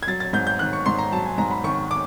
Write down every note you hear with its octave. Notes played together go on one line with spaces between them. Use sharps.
G#6
F#3 A6
A6
G#2 G6
G6
D#3 F#6
C#6
G#2 C6
A#5
F#3 A5
G#5
G#2 A#5
B5
D#3 C#6
D6